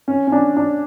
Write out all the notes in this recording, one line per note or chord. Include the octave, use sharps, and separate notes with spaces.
C#4
C#4
D4
D4